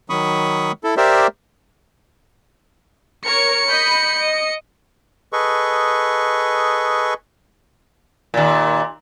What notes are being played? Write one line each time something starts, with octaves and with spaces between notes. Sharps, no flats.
D#3 F#3 B5 C#6 D#6
E4 A4
G4 A#4 C5 D5 E5
A#4 C#5 C#7
D#5 B5 G6
D#5
G#4 A4 B4 D#5 C#6
D#2 A#2